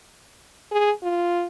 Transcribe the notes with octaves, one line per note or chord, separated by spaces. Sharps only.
G#4
F4